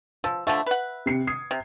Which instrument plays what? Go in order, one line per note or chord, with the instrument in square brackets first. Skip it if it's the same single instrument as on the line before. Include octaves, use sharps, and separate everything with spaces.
[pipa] F3 [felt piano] E6
[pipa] D3 F3 A3 [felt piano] E5
[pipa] B4 F#5
[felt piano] C3 C7 C#7
D#6 G#6 C7
[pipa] C3